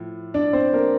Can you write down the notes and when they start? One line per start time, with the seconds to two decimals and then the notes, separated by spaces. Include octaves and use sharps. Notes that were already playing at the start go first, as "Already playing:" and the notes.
Already playing: A2 F3
0.34 D4 D5
0.53 C4 C5
0.73 A#3 A#4